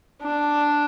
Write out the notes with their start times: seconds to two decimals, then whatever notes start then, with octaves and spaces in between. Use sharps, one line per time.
0.22 D4